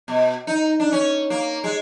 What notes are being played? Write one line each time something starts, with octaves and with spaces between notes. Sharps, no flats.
B2
D#4
D4
C#4
A#3
G#3